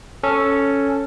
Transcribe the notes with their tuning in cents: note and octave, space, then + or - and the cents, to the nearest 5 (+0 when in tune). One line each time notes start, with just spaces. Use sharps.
C#4 +0 A4 +0